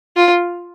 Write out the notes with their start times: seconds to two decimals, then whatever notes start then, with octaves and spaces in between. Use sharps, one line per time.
0.16 F4